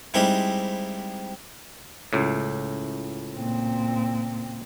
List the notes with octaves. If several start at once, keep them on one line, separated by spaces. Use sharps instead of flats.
G3 G#3 C4 D#4 E4
C#2 A2
A#2 C4